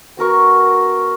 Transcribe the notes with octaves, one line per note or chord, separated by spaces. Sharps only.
B3 F#4 A#4 C#6